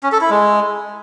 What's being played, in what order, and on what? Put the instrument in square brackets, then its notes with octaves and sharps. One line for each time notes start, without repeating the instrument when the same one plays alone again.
[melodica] C#4
A4
E4
G#3